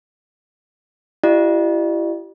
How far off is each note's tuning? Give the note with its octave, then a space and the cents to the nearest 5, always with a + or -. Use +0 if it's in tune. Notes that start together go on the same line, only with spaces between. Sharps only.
E4 +30 G4 -25 D5 +45